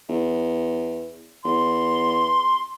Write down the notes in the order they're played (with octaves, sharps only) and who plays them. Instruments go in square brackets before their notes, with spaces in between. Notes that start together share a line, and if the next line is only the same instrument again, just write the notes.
[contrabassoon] E2
[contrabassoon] E2 [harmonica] C6